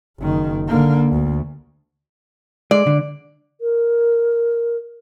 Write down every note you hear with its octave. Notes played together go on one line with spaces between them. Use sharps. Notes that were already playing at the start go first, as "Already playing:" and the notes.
F#1 D#3
D3 A#3
D2
G#3 D5
D3
A#4